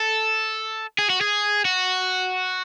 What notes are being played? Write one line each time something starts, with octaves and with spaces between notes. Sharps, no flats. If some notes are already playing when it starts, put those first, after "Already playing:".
Already playing: A4
G#4
F#4
G#4
F#4